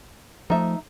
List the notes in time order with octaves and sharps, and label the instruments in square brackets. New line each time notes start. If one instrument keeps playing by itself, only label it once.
[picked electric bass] F3 A3 [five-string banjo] D#4 E5